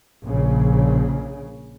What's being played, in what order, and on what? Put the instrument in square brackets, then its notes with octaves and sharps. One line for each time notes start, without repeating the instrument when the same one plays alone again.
[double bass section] A#1 C#3